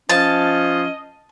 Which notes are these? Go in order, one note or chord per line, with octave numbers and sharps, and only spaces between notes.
F3 C#4 D#5 A5